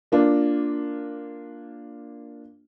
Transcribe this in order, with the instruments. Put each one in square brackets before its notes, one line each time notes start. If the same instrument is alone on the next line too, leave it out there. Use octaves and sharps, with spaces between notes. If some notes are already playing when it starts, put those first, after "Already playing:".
[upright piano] A#3 D4 F4